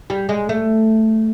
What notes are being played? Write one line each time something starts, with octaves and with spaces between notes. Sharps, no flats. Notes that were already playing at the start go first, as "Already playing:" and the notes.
G3
G#3
A3